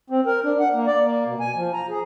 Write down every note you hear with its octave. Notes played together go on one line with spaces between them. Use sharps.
C4
A#4
D4
F#5
A#3
D5
A#3
B2
G#5
F3
A#5
G#4